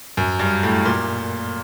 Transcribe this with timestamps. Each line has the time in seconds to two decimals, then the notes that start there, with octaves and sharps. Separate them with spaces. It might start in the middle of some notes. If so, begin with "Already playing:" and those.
0.17 F#2
0.39 G2
0.63 A2
0.85 A#2